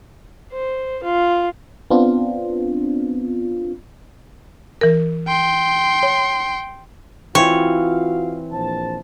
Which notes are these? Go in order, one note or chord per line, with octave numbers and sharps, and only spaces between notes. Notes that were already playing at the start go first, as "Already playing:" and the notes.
C5
F4
B3 C4 D4 F4
E3 A#4
G5 C6
C#5
E3 C4 F4 F#4 C#5 F5
A#1 C5 A5